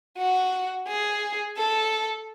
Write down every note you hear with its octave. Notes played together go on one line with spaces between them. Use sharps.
F#4
G#4
A4